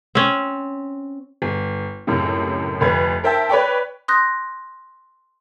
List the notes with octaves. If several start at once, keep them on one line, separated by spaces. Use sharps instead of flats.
C4 C#4
G1
C#2 F#2 A2 C3
F1 D2 B4 G#6
A#4 C5 E5 G5 A5
B4 C#5 D5 G5
C6 D#6 F#6 G6 A#6